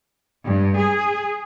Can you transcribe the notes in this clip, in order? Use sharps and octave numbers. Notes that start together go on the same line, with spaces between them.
G2
G#4